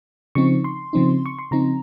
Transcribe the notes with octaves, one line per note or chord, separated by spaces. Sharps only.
C#3 F3 C4 D#4 C#6
C6
C#3 F3 C4 D#4
C#6
C6
C#3 F3 C4 D#4 A#5